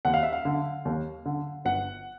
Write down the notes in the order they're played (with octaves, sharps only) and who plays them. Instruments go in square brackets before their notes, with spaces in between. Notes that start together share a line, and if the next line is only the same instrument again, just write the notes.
[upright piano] D#2 F#5
F5
E5
F5
D3
D#2
D3
G1 F#5